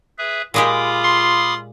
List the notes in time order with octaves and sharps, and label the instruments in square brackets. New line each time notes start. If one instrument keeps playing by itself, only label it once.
[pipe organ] G#4 B4 E5
[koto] A#2 G#3 G4 [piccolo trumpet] F4 [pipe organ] B5 D6 D#6
[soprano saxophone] C6